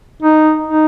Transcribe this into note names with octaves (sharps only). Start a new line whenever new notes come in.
D#4
D#4